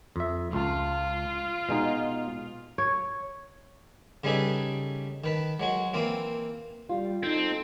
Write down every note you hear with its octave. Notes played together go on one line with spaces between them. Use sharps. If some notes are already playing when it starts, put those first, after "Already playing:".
F2 E5
C#2 F4 A5
B2 G#3 D#4
C#5
C#3 G3 D#4 G#4 A4 B4
D#3 B4 A5
F#3 G#3 F#4
E3 A#3 C4 F4
G3 F4
C4 D#4 A4